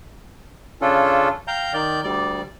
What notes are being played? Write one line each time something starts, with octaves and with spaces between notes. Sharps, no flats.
C#3 C#4 D4 F4 A4
F5 G5 A#5 G6
D#3 D5 G6
D2 G3 D5